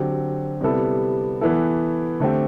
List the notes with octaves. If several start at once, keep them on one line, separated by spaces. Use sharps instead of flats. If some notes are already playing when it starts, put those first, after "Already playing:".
Already playing: D3 F#3 C4 G4
C3 G3 B3 E4 A4
E3 B3 E4 A4
D3 A3 C4 G4